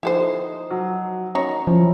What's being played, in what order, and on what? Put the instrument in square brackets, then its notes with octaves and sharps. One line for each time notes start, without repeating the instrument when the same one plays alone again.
[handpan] F3 D#4 [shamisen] E4 A4 C5
[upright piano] F#3
[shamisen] D#3 C#5 [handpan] C#4 [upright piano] A#5
[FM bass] F3 [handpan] F#3 C#4 E4